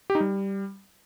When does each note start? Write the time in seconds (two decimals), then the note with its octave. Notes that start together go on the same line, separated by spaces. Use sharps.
0.10 G4
0.15 D#4
0.20 G3